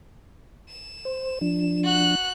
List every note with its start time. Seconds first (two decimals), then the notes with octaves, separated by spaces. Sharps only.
0.69 E7
1.05 C5
1.41 F3 D4
1.84 F#4 F#6